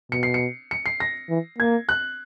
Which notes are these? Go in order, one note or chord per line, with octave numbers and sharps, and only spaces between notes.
B2 C#7
C7
C#7
C#7
C7
A#6
E3
A#3 G#6
F#6